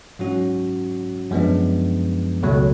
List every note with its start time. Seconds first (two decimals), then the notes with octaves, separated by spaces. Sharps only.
0.19 G#2 F#3 C#4 F#4
1.31 F#2 F3 G#3 B3 D4
2.43 C#2 B2 F#3 A3